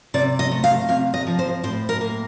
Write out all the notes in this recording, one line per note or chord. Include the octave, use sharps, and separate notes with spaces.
C3 D5
D#5
A3
F5
C3 F5
D#5
F3
C5
A2 C5
A#4
A#3